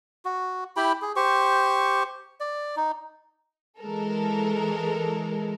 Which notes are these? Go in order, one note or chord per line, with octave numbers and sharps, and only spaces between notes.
F#4
E4 G4 G5 B5
G#4
G4 C5 C#6
D5
D#4
E3 G#3 A4 A#4